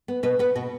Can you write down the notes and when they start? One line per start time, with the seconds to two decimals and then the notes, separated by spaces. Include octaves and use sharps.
0.08 B3
0.23 B2 B4
0.39 B3 B4
0.55 B2 F#4